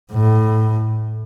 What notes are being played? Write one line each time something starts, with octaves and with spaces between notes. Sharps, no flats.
A2